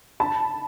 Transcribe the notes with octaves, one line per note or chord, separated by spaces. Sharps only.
A5 B5